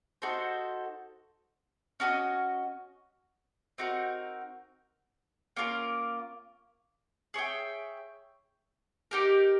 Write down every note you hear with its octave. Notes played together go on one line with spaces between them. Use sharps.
D#4 F#4 A4 C5
C#4 F#4 A#4 D#5
C4 D#4 F#4 A#4
A#3 C#4 F4 A#4
G#4 C#5 E5 G5
D#4 G4 A#4